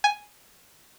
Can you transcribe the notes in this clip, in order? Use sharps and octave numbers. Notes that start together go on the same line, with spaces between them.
G#5